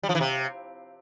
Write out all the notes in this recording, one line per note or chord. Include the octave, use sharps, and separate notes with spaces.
G3
F3
E3
C3